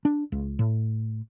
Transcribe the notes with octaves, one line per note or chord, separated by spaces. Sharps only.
D4
C#2
A2